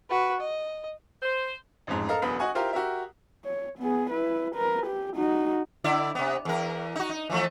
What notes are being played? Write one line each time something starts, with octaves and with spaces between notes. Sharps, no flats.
F#4 B4
D#5
C5
A1 F2 G#2
A4 A#4 D#5 F5 A#5
D#1 A#1 B3 B5 D#6
F#4 D#5 F#5 G#5 C#6
E4 F4 G4 A#4 C5 F5
F#4 G4 A#4 E5
C#5
B3 G#4
E4 B4
A#4 B4
G4
D#4 F#4
D3 E4 D5
C3 B3
E2 A#4
D#4 F#4
D#4
E3 F3 A3